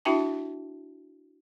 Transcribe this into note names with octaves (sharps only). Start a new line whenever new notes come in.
D4 E4 F#4 E5 G5 A5